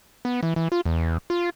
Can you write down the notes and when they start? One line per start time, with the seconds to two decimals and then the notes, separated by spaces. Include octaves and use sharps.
0.25 B3
0.43 E3
0.56 E3
0.72 F4
0.86 E2
1.30 F4